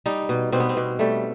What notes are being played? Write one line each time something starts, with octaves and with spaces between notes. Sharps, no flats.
G3 D#4
B2
B2 C4
B3
C4
B2
G3 A3